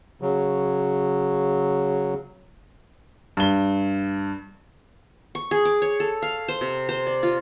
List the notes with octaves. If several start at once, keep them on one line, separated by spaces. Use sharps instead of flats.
C#3 F#3
G2 G7
C#6
G#4
D6
C#5
A4
F5
C5
C3
C5
D5
F4